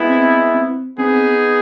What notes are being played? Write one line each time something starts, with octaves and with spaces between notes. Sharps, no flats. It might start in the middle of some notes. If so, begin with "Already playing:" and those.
Already playing: G#3 B3 E4
C4
C4
B3 C4 D#4 G#4